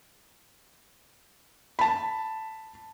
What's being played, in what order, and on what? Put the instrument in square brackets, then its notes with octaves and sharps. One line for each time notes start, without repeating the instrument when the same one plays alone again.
[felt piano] A5 B5